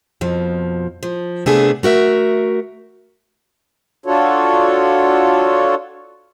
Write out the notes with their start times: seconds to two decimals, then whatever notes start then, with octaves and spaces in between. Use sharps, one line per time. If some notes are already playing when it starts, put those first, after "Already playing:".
0.21 F2 B2 F3
1.03 F3
1.46 C3 A3 B3 D4 G#4
1.83 A3 F#4 A#4 E5
4.06 D4 F4 F#4 A4 C#5